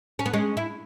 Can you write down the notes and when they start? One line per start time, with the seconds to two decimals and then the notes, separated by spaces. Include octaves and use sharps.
0.19 C#4
0.26 B3
0.33 G#3 C#4
0.57 E4